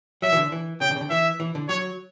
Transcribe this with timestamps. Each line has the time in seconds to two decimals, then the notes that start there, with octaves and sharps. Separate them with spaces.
0.22 F#3 E5
0.32 E3
0.37 D3
0.52 E3
0.81 C#3 G5
0.91 D3
0.96 C#3
1.01 D3
1.10 E3 E5
1.40 E3
1.55 D3
1.69 F#3 C#5